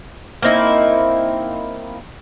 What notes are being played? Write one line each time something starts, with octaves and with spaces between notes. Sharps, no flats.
A#3 C4 D#4 E4